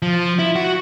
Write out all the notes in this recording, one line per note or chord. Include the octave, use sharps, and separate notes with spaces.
F3
E4
F#4